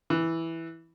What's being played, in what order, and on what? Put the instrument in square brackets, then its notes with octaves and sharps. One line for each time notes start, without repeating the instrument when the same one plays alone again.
[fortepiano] E3